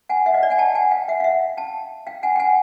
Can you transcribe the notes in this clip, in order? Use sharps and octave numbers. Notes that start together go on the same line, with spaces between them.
F#5 G#5
E5 F#5
D#5 F5
D5 E5
F#5 G#5
G5 A5
F#5 G#5
F5 G5
E5 F#5
F5
E5 F#5
G5 A5
F5 G5
F#5 G#5
G5
F#5 G#5